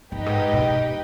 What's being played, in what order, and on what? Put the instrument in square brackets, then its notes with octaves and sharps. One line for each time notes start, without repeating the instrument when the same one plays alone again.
[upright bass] G2 [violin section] D#4 G4 B4 D#5 G5
[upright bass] G#2
B2